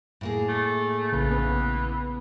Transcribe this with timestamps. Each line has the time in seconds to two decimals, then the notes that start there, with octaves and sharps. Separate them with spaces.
0.21 A2 A#3 G#4
0.48 A3
1.12 A#1 C#3 E3
1.31 B3